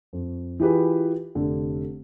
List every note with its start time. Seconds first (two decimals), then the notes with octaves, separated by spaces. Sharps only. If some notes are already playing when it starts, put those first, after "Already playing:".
0.13 F2
0.60 E3 F4 G4 G#4 B4
1.35 F1 D3